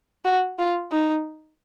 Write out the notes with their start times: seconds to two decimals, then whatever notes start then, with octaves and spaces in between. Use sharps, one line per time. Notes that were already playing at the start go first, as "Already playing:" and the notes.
0.25 F#4
0.59 F4
0.92 D#4